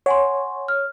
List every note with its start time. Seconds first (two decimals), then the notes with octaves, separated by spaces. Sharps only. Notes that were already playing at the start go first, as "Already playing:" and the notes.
0.06 C#5 F#5 G#5 C6
0.68 F6